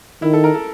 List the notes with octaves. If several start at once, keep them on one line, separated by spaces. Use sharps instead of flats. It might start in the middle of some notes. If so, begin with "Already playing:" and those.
D#3 E4
A4
A#4
A4